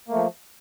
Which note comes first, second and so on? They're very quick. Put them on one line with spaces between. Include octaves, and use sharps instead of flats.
A#3 A3 F3